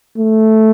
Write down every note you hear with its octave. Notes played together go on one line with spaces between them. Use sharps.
A3